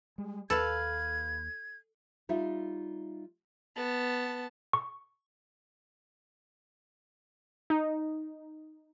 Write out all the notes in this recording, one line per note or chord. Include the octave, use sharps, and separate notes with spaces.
G3 G#3
D#2 A4 B4 F5 G#6
G3 D#4 F4 E5 F5
B3 A5
C#6
D#4